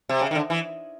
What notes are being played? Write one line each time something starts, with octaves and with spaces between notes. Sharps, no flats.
C3
C#3
D#3
D3
E3